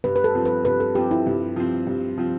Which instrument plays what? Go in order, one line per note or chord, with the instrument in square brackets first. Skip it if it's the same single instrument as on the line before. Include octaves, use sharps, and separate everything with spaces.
[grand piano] G2 [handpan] B4
[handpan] B4
A4
[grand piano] F3 C4
[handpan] B4
[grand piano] G2 [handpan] B4
[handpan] A4
[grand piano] F3 C4 [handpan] G4
[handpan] E4
[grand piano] G2
F3 C4
G2
F3 C4